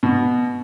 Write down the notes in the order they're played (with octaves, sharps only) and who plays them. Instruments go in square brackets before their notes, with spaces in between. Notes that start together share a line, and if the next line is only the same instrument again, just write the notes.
[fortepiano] B2